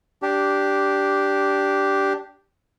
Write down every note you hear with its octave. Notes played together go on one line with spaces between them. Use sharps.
D4 G4